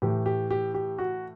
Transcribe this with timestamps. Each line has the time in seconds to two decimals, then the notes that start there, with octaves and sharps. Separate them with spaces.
0.02 A2 E3 G4
0.26 G4
0.51 G4
0.74 G4
0.98 F#4